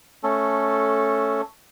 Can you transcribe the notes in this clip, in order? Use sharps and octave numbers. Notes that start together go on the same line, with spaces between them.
A3 C#4 A4